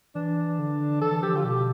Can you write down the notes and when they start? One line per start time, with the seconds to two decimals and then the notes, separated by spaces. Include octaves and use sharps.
0.15 E3 D4
0.59 D3
1.02 E3 A4
1.12 E3
1.22 F3 G4
1.34 D3 F4
1.44 B2 G4